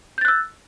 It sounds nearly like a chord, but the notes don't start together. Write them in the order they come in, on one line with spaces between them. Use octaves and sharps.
G6 A6 F#6 E6